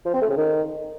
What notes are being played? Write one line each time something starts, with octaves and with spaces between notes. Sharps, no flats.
F3
C4
A3
C#3
D#3